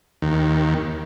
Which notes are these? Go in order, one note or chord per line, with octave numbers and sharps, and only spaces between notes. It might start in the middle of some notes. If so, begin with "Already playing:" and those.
D#2